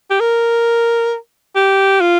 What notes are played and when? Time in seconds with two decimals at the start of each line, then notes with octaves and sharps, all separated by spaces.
0.11 G4
0.20 A#4
1.56 G4
2.01 F4